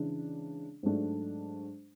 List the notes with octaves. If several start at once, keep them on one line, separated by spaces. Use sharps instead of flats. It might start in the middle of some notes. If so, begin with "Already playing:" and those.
Already playing: C#3 E3 G#3 D4
G#2 F#3 A3 D4